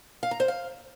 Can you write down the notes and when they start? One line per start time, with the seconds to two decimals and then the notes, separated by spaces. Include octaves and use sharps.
0.23 F5
0.31 A#5
0.40 C5
0.48 F5